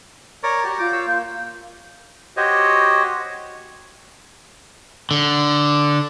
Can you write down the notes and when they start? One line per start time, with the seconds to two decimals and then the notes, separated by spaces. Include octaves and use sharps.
0.43 A#4 C#5 D5
0.64 F#4 G4
0.79 F4 D5 D6 G6
0.93 C#5 E6
1.07 A#3
2.37 F#4 G4 C5 C#5 D#5
5.11 D3